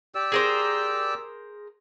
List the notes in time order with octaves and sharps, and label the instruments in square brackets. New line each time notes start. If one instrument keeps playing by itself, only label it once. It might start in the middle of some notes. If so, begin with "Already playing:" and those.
[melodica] G4 D5 E6
[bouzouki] G#4 A#4 C5